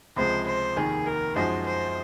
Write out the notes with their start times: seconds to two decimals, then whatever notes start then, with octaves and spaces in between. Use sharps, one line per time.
0.16 C#2 C3 F3 G#3 C5
0.47 C5
0.76 F1 D#2 D#3 G#4
1.06 A#4
1.36 F#2 F3 G#3 D#4 F#4 C5
1.66 C5